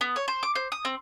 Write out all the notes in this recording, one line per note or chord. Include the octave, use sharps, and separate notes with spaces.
B3
C#5
C5
D6
C5
D#6
C4